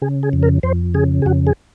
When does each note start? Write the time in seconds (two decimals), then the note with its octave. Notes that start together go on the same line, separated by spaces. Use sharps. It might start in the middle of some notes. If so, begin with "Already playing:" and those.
0.02 C#3 G#4
0.23 G#4
0.33 F2
0.43 A#4
0.63 F2 C5
0.94 C#3 G#4
1.22 G#4
1.26 F2 F#4
1.47 G#4